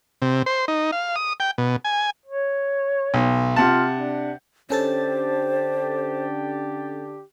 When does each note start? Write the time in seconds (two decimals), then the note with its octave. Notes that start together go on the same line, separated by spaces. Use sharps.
0.22 C3
0.46 C5
0.68 D#4
0.92 F5
1.16 D#6
1.40 G5
1.58 B2
1.84 G#5
2.26 C#5
3.14 B1
3.56 C3 F4 F#5 A5
3.94 D4
4.70 D3 C#4 D4 G4 A4 C5 A6